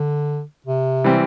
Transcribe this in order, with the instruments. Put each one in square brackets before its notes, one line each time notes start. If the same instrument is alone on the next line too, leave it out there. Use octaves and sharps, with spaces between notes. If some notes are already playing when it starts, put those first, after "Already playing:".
Already playing: [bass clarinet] D3
C3
[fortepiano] E3 G3 C4